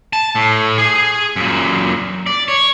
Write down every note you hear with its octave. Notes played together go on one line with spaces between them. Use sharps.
A5
A2
G#4
F#2 A#2
D5
C#5